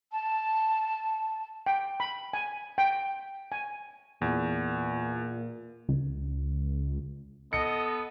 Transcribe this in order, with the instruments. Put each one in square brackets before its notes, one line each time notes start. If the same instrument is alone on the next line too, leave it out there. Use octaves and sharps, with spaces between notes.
[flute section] A5
[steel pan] G5
B5
G#5
G5
G#5
[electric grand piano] E2 [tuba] A#2
[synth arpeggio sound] C#2
[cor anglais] B3 [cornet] A4 [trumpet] D#5 [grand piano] C#7